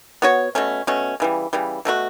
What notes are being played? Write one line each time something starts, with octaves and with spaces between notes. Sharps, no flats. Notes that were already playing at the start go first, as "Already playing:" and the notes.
B3 F#4 C#5
B2 A3 C#4
B2 A3 C#4
C#3 E3 G3
C#3 E3 G3
B2 A3 D4 F#4